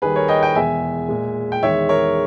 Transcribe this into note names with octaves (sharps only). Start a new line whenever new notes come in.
D#2 D#3 G3 G#4 B4
A#4 C#5
D#5 G5
D#5 G5
E2 B2 G#3 E5 G#5
A#2 G#3
G5
E2 D#3 G#3 C#5 E5
A#4 C#5